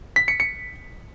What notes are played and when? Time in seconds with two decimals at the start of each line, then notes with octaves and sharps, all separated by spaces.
0.16 B6
0.28 C#7
0.40 C#7